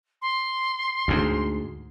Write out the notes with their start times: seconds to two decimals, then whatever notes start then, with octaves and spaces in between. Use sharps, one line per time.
0.22 C6
1.08 D2 G#2